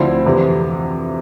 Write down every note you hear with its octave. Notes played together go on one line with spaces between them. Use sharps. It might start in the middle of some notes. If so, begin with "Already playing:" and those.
Already playing: D2 D3 F3 C4 E4
F2 C3 E3